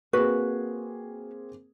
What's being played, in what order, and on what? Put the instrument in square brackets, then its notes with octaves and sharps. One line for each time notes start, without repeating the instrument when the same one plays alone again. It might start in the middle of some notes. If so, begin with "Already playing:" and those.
[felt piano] A#3 C4 G#4 [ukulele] F#4 B4